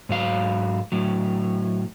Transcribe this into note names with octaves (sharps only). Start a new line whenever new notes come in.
G#2 F#3 F5
A2 F#3